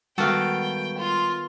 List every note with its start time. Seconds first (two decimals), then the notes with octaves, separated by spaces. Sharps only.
0.18 D#3 G3 G#3 B3 F#4 A4 F5 G5
0.98 F4